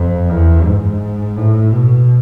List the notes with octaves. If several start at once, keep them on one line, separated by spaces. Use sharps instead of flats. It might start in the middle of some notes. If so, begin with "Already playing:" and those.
Already playing: F2
E2
G#2
A2
B2